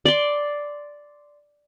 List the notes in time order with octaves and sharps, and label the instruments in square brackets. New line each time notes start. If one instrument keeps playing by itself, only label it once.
[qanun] D5 C6